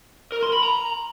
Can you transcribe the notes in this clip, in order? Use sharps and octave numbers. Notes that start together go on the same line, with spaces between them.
A#4
C6
B5
A#5